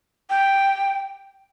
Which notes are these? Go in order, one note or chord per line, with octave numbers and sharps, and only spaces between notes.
G5